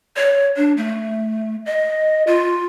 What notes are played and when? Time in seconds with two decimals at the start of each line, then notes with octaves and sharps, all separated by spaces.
0.17 C#5
0.56 D4
0.77 A3
1.66 D#5
2.27 F4